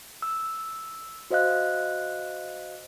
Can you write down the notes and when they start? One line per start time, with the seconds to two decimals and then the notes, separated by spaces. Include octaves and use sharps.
0.22 E6
1.30 F#4 C5 D#5 F5 F#6